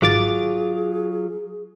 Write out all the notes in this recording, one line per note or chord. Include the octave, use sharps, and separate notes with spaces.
G#1 F#3 F4 G#4 D6 A6